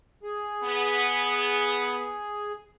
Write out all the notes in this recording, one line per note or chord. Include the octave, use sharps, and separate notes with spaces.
G#4
B3